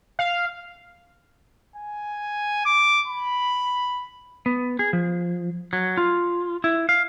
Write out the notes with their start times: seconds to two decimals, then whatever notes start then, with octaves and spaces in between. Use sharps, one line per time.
0.19 F5
1.76 G#5
2.65 D6
3.07 B5
4.46 B3
4.79 G#4
4.93 F3
5.73 F#3
5.97 F4
6.64 E4
6.89 F5